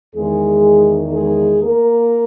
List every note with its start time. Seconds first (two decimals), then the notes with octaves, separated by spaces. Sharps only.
0.16 E2 D#3 G#3 G#4
1.12 G#3 G#4
1.61 A#3 A#4